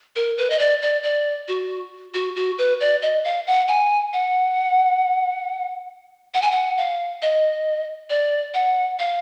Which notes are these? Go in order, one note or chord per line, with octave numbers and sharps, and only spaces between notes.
A#4
B4
D#5
D5
D5
D5
F#4
F#4
F#4
B4
D5
D#5
F5
F#5
G#5
F#5
F#5
G#5
F#5
F5
D#5
D5
F#5
F5